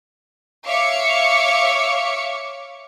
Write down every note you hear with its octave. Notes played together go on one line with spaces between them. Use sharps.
C#5 E5 F5 D6 C#7